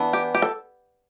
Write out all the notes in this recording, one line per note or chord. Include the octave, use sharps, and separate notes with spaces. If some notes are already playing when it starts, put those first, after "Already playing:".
Already playing: E3 B3 D4
G4
G4
A4